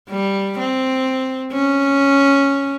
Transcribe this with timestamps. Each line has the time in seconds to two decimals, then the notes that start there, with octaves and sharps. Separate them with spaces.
0.10 G3
0.59 C4
1.52 C#4